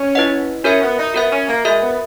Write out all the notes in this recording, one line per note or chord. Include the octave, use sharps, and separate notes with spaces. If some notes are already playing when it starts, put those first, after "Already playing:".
Already playing: C#4
E4 B4 D#5 F#5
C#4 F#4 A#4 E5
B3
D#4
B3 F#4 A#4 E5
C#4
A#3
G#3 F#4 A#4 E5
B3